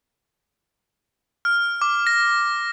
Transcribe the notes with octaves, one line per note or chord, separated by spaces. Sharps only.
F6
D6
A#6